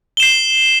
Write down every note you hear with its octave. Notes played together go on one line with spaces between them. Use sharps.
C7 E7 G7